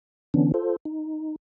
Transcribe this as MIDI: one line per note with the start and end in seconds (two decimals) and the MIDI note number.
0.34 0.52 50
0.34 0.52 52
0.34 0.52 59
0.34 0.52 61
0.34 0.52 62
0.54 0.76 65
0.54 0.76 69
0.54 0.76 72
0.85 1.36 63